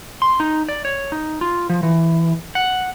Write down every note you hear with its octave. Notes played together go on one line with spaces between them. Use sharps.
C6
D#4
D5
C#5
D#4
F4
F3
E3
F#5